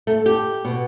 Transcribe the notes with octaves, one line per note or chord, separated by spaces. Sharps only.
A3
G4
B2